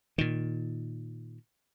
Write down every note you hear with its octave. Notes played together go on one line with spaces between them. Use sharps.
A#2 D#3